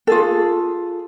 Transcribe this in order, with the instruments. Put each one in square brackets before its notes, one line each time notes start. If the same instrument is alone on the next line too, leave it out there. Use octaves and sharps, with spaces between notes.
[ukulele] F4 G#4 A4